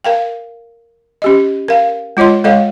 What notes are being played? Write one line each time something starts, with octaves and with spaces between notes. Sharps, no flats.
A#4 F5 G5
C#4 G4 D#5
A#4 F5
G#3 F4 C#5 D#5 C6
G#3 A4 C#5 D#5 F5